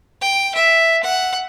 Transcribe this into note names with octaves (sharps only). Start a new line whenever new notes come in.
G5
E5
F#5